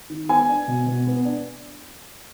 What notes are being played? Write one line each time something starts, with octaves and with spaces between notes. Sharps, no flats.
D#3
B3 G#5
D4
B2
B2
B3
D4